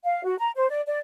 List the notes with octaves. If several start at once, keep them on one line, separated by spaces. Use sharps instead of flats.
F5
F#4
A#5
C5
D5
D5